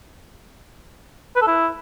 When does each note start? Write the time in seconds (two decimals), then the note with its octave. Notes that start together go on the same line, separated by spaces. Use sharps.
1.36 B4
1.42 A4
1.47 E4